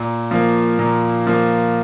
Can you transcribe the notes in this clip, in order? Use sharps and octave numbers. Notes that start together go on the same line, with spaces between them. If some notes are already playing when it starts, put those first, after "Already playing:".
Already playing: A#2
F3 A#3
A#2
F3 A#3